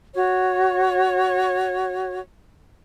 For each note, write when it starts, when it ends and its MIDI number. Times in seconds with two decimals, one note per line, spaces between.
0.14 2.19 66
0.14 2.19 73